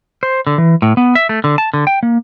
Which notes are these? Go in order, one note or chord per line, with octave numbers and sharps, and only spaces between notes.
C5
D3
E3
A2
B3
E5
A3
D3
A5
D3
G5
A#3